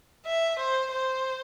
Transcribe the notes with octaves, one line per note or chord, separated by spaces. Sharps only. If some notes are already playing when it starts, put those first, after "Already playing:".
E5
C5
C5